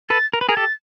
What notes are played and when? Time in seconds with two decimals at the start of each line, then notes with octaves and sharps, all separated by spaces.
0.10 A4 B4 A6
0.33 A#4
0.41 B4
0.49 G#4 A#4
0.52 G#6
0.56 G4 A4 A6